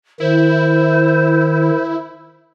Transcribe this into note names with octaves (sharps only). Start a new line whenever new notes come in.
D#3 E4 C5